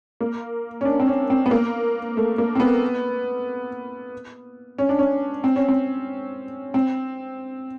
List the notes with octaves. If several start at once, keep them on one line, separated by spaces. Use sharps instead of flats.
A#3
C#4
D4
C4
C#4
C4
B3
A#3
A3
A#3
C4
B3
C#4
D4
C#4
C4
C#4
C4
C4